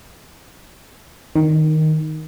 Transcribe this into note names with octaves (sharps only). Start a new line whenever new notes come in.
D#3